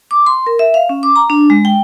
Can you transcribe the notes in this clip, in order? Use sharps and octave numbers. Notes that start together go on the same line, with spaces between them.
D6
C6
A#4
E5
F5
C#4
D6
A#5
D4
G#3
G5